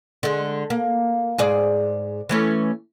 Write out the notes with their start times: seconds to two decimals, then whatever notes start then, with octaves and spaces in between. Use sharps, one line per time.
0.23 D3 G#3
0.70 A#3
1.38 G#2 G#4 D5
2.29 E3 A3 C#4